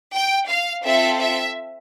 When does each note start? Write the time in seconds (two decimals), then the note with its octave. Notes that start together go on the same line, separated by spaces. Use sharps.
0.14 G5
0.48 F5
0.84 C4 F4 A4 E5
1.20 E5